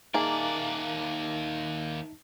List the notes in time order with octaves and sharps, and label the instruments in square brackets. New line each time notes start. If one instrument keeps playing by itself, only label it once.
[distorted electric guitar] D#2 D5 [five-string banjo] A#3 G#4 [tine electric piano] D#4 E5 A5